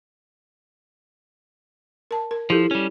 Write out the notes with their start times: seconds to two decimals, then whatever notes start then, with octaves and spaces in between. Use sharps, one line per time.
2.11 A#4 A5
2.31 A#4
2.50 F3 E4 G4 A4
2.71 G3 C#4